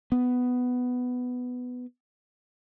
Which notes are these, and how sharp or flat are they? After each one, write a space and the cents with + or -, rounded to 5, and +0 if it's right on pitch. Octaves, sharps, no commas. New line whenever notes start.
B3 +10